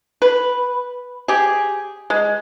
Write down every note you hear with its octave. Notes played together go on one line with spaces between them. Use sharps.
B4
G4 G#4
G#3